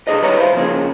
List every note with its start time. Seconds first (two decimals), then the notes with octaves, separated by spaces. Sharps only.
0.07 C#2 B2 D3 G#4 A4 D#5
0.21 G2 D#3 G3 B4 C#5 A#5
0.37 E4 C5 F5
0.53 C#3 F3 A#3 C#4 G#4